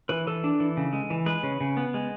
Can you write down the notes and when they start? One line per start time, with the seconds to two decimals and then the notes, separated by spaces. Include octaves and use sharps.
0.09 E3 B4
0.27 E3 A4
0.44 D4
0.60 E3
0.77 C#3
0.93 G#3
1.10 E3
1.26 G#3 B4
1.43 C#3
1.61 C#3
1.77 B3
1.94 G#3